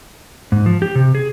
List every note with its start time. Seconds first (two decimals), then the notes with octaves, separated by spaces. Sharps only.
0.52 G#2
0.66 F3
0.82 G4
0.95 C3
1.15 G#4